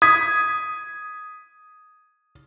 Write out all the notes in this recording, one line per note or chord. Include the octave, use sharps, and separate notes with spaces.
D#6 G#6 B6